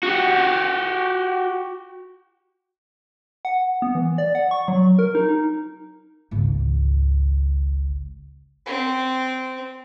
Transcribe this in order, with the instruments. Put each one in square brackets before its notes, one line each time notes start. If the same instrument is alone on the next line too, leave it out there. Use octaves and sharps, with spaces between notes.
[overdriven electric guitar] F#4 G4
[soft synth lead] F#5
B3
E3
D5
F#5
C#6
F#3
A#4
D#4
D#4
[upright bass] G#1 C#2
[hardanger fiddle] C4